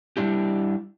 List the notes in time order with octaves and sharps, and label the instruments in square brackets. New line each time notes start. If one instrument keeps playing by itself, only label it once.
[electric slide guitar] G3 D4 E4 G4